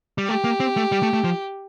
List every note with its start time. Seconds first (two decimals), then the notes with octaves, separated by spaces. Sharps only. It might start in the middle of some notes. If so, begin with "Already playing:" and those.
0.18 G3
0.28 A3 G4
0.44 A#3
0.60 C4
0.76 A3
0.92 G3
1.03 A3
1.13 A3
1.24 F3